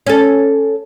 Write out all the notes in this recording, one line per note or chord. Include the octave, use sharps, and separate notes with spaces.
C#4 A4